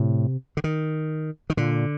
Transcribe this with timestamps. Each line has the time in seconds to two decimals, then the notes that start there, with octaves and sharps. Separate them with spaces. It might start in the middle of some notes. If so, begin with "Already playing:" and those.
Already playing: A2 C3
0.57 D3
0.64 D#3
1.50 D#3
1.57 A#2 D3